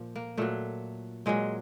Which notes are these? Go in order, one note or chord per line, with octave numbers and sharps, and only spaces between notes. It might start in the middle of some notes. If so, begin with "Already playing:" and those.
Already playing: A#2 F3
A#3
A#2 F#3 A3
A#2 F#3 G#3